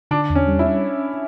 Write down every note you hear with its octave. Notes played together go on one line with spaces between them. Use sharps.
D3 D4
E2
C#4
G3
E4
C#4